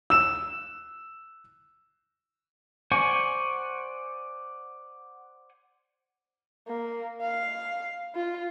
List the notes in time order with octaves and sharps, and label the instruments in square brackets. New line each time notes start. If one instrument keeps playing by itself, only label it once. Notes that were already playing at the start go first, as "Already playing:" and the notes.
[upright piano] E6 E7
[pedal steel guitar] C5 D5 F#5 G#5 C#6
[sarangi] A#3
F5
F4